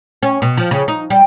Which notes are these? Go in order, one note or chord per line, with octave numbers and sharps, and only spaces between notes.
C#4
B2
F3
C#3
D#4
G3